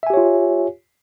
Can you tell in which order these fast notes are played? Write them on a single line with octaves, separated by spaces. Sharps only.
E5 G#5 G4 C#5 F4